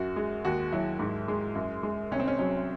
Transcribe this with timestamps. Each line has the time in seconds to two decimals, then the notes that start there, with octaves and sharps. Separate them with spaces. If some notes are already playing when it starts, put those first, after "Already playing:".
Already playing: F#2 F#4
0.16 G#3
0.45 D#2 F#4
0.72 F#3 E4
0.99 G#2
1.28 G#3
1.55 F#2
1.83 G#3
2.11 C2 C#4
2.20 C4
2.28 C#4
2.39 F#3 C#4